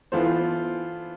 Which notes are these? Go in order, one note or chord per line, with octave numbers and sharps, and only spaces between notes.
E3 B3 F4 A4 C5